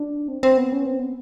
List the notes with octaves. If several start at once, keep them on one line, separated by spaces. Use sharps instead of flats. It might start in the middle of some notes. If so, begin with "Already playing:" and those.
Already playing: D4
C4
C4
B3
C#4
C4
B3